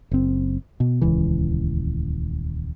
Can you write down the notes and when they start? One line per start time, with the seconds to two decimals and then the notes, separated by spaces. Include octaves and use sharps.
0.11 F#1 C4
0.80 B2
1.01 D#1 C#2 E3